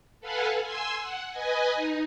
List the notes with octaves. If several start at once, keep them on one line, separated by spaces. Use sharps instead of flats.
A4 B4 F5 F#5 G#5
G#5 C6 E6
F#5
B4 D#5 G#5
D#4